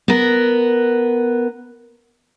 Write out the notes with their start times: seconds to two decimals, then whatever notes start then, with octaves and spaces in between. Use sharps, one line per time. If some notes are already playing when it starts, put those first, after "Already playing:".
0.08 B3 A#4